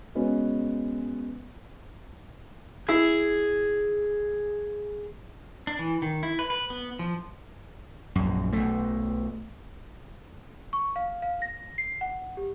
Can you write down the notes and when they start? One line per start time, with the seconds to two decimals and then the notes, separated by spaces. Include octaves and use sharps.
0.15 G#3 B3 C#4 F#4
2.89 E4 G#4
5.67 D4
5.79 E3
6.02 D#3
6.23 E4
6.39 B4
6.50 B4
6.70 B3
6.99 F3
8.16 A#1 F#2
8.52 B1 A3
10.73 C#6
10.96 F5
11.22 F5
11.42 A#6
11.78 C7
12.01 F#5
12.37 G4